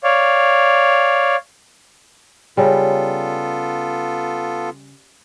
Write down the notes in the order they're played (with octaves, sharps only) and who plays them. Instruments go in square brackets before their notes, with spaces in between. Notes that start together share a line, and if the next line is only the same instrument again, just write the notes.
[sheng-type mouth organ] C#5 D5 F5
[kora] C#3 G3 [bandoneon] B3 F4 A4